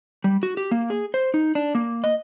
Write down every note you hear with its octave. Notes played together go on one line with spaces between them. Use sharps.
G3
F#4
G4
A#3
G#4
C5
D#4
D4
A#3
D#5